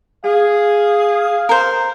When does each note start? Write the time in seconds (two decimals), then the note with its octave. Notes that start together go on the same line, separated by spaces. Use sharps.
0.25 G#4 F5
1.49 A#4 C5